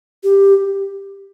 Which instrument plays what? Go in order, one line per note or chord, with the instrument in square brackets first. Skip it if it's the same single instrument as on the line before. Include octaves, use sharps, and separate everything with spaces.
[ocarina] G4